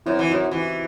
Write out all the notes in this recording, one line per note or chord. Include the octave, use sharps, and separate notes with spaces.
F#2 C4 E4
E3
D#4 F#4
F#2
E3 E4 G4